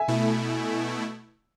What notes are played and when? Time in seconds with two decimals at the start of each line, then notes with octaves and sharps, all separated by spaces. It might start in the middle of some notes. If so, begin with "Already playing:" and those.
Already playing: E5 G#5
0.08 B2 A3 E4